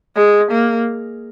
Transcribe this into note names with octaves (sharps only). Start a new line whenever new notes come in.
G#3
A#3